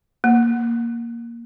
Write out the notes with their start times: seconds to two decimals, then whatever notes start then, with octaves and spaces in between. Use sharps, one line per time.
0.24 A#3